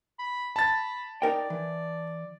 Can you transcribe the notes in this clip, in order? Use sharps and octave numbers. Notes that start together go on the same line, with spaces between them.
B5
A5 B5 A6
D#4 A#4 D5 G5
E3